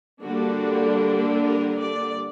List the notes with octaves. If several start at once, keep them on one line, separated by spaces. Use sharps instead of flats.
D3 G3 A#3 D4 F#4
A4
A#4
D5